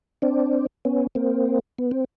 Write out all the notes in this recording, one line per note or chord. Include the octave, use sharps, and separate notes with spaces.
C4 D4
B3 C#4
A#3 C4
B3
C4